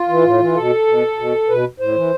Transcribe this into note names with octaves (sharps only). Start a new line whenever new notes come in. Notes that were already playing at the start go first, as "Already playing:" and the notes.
Already playing: F4
E3
A2
E3
B2 A4
B2
B2
B2 B4
A2 C5
E3